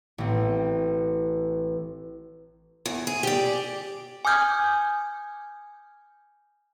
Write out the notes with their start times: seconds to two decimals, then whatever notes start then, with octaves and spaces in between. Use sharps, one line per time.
0.18 A1 C4
2.86 E2
3.07 G#4
3.23 G4 D5
4.25 G#5 D6 D#6 F6 G6 G#6